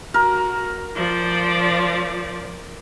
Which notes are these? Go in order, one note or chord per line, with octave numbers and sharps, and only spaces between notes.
F#4 A#4
F3 D5